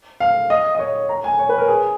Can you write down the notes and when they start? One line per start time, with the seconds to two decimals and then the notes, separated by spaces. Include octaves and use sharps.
0.20 F5
0.50 D#5
0.75 D#5
0.79 C#5
1.09 A#5
1.24 G#5
1.39 C#5
1.49 B4
1.58 A#4
1.68 G#4